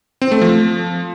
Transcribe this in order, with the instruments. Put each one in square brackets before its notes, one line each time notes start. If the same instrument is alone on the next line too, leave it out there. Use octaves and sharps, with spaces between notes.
[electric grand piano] C4
A3
F3